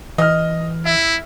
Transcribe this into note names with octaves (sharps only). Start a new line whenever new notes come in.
E3 D#5 F6
E4 E5